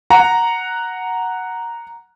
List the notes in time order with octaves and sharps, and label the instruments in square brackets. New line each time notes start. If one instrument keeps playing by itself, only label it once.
[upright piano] F#5 A#5